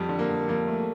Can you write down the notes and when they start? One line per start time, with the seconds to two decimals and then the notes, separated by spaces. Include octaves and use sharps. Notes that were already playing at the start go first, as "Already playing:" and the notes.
Already playing: F2 G3
0.09 D3
0.19 A#3
0.29 F2
0.48 F2 A#3
0.68 A3